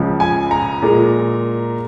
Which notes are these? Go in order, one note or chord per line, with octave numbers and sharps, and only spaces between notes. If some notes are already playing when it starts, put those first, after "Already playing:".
Already playing: C#2 C#3 F3
G#5
A#5
A#2 G#3